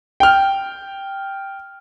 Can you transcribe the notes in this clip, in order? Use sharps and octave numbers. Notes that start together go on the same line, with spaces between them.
G5 F6